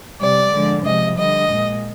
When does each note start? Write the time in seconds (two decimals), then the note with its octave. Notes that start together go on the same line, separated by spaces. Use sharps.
0.19 C3 G3 D5
0.52 D3 F3 G#3
0.83 C3 F3 G#3 D#5
1.16 D3 G3 D#5
1.48 A#2 G#3